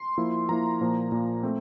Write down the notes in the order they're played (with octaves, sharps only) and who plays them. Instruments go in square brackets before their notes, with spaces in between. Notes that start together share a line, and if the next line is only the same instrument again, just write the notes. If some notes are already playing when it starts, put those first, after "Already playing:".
Already playing: [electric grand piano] C6
F3 A#3 E4
F3 A#3 E4 A#5
A#2 F3 A#3
A#2 F3 A#3
A3 C4